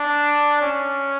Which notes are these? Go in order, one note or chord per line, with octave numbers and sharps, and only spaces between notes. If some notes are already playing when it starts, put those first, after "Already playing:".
Already playing: D4
C#4